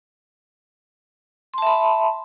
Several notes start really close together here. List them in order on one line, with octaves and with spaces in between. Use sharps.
C6 A5 E5 B5